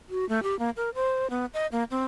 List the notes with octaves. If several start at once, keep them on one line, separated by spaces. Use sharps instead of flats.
F#4
A3
G4
A#3
A#4
C5
B3
D#5
A#3
C4